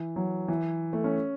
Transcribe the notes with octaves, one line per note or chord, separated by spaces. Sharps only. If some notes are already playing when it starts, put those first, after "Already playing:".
Already playing: E3
F#3
E3
A3
C#4